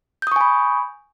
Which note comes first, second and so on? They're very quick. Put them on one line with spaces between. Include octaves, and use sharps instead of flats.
G6 D#6 C#6 G#5 B5